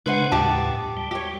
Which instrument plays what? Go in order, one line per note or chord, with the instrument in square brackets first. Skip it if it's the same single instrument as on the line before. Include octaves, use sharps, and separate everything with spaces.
[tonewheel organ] C#3 G#3 D4 [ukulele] B4 C5 F#5
[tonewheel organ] D#2 A2 [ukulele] G4 A5
[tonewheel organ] G3
[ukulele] G4 C#5